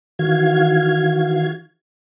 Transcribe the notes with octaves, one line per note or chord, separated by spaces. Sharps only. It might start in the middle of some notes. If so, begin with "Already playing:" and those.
D#3 E3 F#4 F5 G#6